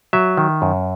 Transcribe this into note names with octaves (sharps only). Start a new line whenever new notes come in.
F#3 E5
D#3
F#2